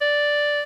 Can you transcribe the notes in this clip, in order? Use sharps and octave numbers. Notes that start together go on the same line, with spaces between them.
D5